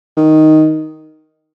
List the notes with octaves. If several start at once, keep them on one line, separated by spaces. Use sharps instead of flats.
D#3